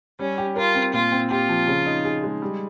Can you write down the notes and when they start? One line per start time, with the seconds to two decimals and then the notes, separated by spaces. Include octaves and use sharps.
0.19 G3 C#4
0.38 G4
0.56 F4 A#4
0.75 C4
0.93 A#2 F4
1.12 C4
1.31 F4 G4
1.49 F3
1.67 C#3
1.86 D#4
2.05 G#4
2.23 G#3
2.42 G3